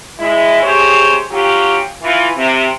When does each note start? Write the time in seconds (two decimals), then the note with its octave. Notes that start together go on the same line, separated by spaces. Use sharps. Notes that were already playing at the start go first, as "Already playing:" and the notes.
0.19 G#3 E4
0.62 C3 G4 G#4 C5 C#5
1.31 F#3 C#4 F4 G4
2.02 E3 F4
2.37 C3